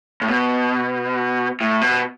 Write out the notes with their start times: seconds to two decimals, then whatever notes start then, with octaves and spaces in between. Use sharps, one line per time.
0.22 A2
0.29 B2
1.61 A2
1.81 B2